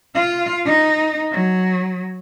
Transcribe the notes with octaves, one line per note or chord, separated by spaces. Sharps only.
F4 F5
D#4
F#3